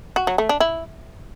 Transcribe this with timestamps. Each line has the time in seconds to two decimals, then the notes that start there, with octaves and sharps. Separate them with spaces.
0.16 F#4
0.27 F#3
0.38 A3
0.49 D4
0.60 E4